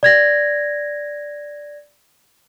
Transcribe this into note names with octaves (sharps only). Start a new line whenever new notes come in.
D5 G#6 A#6